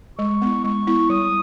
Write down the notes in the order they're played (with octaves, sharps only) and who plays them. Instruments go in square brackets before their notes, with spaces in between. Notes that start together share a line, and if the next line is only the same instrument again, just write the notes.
[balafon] G#3 [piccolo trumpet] C#6
[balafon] B3 E4
[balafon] G#3 [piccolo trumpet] C#6
[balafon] B3 E4
[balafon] G3 [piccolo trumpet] D#6